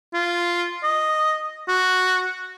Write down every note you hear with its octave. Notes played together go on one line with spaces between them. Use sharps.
F4
D#5
F#4